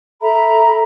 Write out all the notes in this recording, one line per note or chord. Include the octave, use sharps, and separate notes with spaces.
A4 E5 A#5 B5